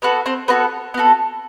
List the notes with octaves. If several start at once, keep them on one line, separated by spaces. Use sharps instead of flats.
B3 F#4 A4 B4
C4 C5
B3 F#4 A4 B4
B3 F#4 A4